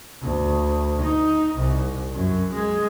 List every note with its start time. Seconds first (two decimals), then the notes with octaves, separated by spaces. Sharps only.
0.22 D2
1.02 D#4
1.55 C2
2.14 F#2
2.53 G#3